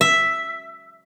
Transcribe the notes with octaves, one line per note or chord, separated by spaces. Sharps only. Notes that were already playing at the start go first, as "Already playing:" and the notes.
E5